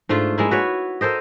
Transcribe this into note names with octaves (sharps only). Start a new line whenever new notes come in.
G#2 A3 D4 F4
G#3 A#3 E4
F#4 B4 C#5
A4 A#4 C5 D#5